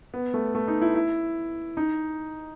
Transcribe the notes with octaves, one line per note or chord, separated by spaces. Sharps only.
B3
A3
A3
D#4
E4
E4
D#4